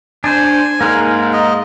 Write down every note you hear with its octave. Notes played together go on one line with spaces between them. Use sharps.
D4 C5 G#5
G#2 A#3 A#4 F6
D#5